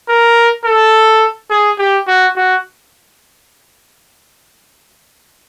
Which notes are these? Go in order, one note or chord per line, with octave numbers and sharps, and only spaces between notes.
A#4
A4
G#4
G4
F#4
F#4